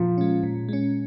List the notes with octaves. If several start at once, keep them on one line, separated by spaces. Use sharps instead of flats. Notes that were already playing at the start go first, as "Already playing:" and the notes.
Already playing: A#2 F3
G#3 C#4
A#2
G#3 C#4